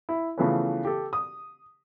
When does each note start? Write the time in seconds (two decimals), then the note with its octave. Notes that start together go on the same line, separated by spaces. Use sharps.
0.09 E4
0.38 C#3 E3 F3 A3 B3 C#4
0.85 G4 A4
1.13 D#6